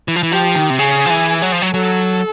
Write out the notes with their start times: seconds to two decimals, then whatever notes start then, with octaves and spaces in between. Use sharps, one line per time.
0.08 E3
0.16 F3
0.23 E3
0.32 F3 G4
0.55 D#3
0.70 C3
0.79 C#3 G#4
1.06 F3
1.10 E3
1.42 F#3
1.52 F3
1.62 F#3
1.73 F#3 A4